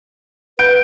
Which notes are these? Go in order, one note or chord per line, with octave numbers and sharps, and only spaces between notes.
B4 G6 D7